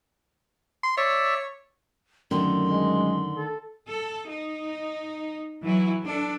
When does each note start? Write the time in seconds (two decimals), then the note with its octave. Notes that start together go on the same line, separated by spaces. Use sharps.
0.83 C6
0.97 C#5 D5 E5
2.31 F#2 D3 D#3 A3 C6
2.67 G#3
3.36 A4
3.88 A4
4.30 D#4
5.63 E3 F#3 E4
6.04 D4 A4